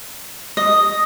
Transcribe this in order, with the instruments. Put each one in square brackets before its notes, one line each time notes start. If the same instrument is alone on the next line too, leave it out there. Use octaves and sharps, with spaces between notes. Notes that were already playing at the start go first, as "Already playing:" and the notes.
[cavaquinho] D#5